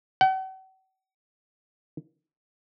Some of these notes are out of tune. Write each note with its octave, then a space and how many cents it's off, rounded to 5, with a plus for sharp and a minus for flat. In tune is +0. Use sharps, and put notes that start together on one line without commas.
F#5 +45